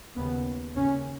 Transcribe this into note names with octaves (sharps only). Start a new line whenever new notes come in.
D#2 C#3 B3
D#2 C#3 C#4